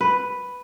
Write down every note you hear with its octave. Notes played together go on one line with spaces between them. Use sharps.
B4